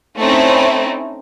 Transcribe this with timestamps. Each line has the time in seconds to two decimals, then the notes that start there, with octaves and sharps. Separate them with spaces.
0.19 A3 C4 C#4 D#4 E4